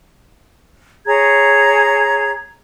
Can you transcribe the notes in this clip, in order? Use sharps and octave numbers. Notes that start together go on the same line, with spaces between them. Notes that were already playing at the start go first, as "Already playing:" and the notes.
G#4 C#5 A#5 G#6